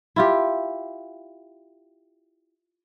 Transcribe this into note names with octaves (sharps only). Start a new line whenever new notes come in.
E4 F4 G4